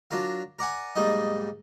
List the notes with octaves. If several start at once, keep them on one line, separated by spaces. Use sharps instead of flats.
F#3 D4 F4 A#4 F5
A#4 D5 F#5 G#5
B1 G#2 G3 A#3 D#4 D#5